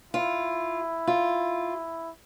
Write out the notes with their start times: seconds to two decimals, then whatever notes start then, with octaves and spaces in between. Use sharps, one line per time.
0.13 E4 F4
1.07 F4